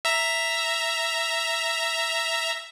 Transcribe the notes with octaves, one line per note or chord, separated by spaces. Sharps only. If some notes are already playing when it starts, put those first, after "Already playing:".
E5 A#5